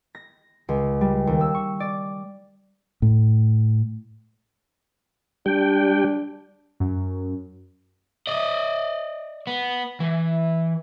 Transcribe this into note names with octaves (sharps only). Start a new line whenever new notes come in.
A#6
C#2
G3
D#2
E6
C#6
D5
A2
G3 D4 G5
F#2
D5 D#5
B3
E3